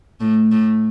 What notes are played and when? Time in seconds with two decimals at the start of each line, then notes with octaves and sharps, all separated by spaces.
0.20 A2 A3
0.52 A2 A3